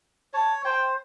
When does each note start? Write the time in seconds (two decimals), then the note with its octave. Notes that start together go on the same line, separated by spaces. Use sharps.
0.33 C#5 A5
0.65 C5 G5